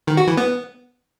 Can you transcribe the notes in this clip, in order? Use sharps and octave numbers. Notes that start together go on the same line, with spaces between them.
D#3
F#4
E3
B3